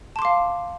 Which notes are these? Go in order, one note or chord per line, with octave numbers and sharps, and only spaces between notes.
F5 A5 C6 D6